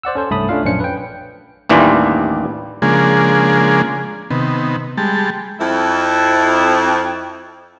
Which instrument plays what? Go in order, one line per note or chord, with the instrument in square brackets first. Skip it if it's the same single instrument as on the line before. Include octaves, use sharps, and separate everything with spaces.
[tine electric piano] C5 D5 F#5 E6
C#4 A4 C5
C2 G2 A3 A5 B5 D#6
A3 C#4 D4 F4 F5
A#1 F#2 C#4 D4 C5 C#7
B4 G5
[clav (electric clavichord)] A1 D#2 E3 G3 D4 F4
[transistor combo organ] C#3 F3 G#3 A#3 D4 G#4
C3 D#3 B3
G3 G#3 A5
[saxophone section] F2 E4